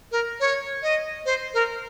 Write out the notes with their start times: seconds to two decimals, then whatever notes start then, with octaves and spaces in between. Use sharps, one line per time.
0.12 A#4
0.40 C#5
0.83 D#5
1.26 C5
1.54 A#4